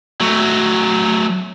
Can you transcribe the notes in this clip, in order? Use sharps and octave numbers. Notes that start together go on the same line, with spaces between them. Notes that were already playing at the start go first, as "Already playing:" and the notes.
F#3 A3